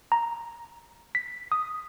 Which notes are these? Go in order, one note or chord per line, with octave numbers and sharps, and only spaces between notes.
A#5
B6
D#6